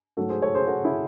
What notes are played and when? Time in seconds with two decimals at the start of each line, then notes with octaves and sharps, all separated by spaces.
0.17 G#2 F#3 A3 F#4 A4
0.29 G#4 C5
0.42 A4 C#5
0.55 G#4 C5
0.67 F#4 A4
0.84 E4 G#4